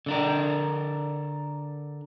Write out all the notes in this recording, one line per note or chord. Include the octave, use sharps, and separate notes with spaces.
D3 D4 A#4